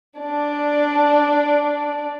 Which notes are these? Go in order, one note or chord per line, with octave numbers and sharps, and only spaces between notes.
D4 D5